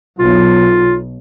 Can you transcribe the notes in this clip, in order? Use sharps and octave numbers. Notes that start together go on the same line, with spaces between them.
B1 F4